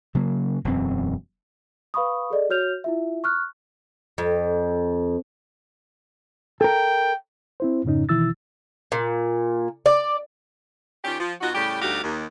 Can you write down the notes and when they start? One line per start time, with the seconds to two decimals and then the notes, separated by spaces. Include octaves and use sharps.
0.15 C#3 F#3 A#3
0.65 E1 F#2 C4
1.94 B4 F5 B5 C#6 D#6
2.30 G#4 A4 D5 D#5
2.50 F#4 C#5 F6 G6 F7
2.84 E4 F4 E5
3.24 C#6 F6 F#6
4.18 F2
6.61 A4 A#4 G5
7.60 C4 E4 C5
7.85 F2 G#2 C#3 C#4 D#4
8.09 B2 D#3 E3 E4 E6 A6
8.92 A#2
9.86 D5
11.05 D#3 C#4 F4 G4
11.20 F3
11.41 B2 D#4 F4 F#4
11.55 A2 C#3 G3 G4
11.82 D2 G3 D#4 F#4 G4 F5
12.04 D#2